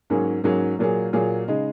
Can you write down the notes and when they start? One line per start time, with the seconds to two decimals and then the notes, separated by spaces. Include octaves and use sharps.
0.10 G#2 F#3 A#3 C#4 G#4
0.44 G#2 F#3 A#3 C#4 G#4
0.79 A#2 F#3 A#3 F4 G#4
1.13 A#2 F#3 A#3 F4 G#4
1.48 C#3 G#3 D#4 G#4